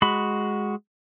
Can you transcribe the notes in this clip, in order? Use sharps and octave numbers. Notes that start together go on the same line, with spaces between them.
G#3 F#4 B5